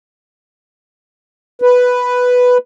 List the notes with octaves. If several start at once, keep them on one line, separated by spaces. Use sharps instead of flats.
B4